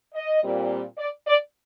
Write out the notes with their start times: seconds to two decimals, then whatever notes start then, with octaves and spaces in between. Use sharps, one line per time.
0.15 D#5
0.43 A#2 G3 C4
0.98 D5
1.27 D5